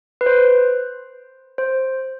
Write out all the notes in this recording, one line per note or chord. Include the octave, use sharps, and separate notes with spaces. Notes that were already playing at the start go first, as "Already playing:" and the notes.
B4
C5
C5